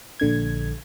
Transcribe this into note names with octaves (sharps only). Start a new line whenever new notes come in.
A#1 D3 G#6